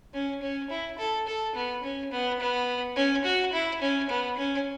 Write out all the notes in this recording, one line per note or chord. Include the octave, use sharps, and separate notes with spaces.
C#4
C#4
E4
A4
A4
B3
C#4
B3
B3
C#4
F#4
E4
C#4
B3
C#4